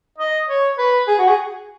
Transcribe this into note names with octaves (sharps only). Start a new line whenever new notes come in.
D#5
C#5
B4
G#4
F#4
G#4